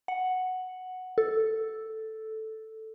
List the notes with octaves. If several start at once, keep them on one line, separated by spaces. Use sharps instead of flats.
F#5
A4